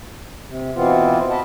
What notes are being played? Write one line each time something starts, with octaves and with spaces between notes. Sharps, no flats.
C3
B2 E3 B3 C4 F4
B4 D#5 A5